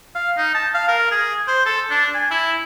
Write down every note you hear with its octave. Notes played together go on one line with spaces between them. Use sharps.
F5
D#4
A5
F5
A#4
G#4
C5
A4
D4
G#5
E4